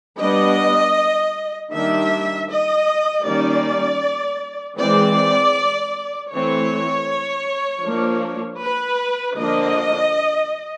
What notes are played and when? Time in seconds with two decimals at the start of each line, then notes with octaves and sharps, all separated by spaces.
0.18 G3 B3 D4 D#5
1.71 D#3 G3 A#3 D4 E5
2.48 D#5
3.24 D#3 G3 A#3 C#4 D5
4.77 E3 G#3 C4 D5
6.31 E3 A3 C4 C#5
7.84 F3 A#3 D4
8.61 B4
9.37 D3 F3 A#3 D4 D#5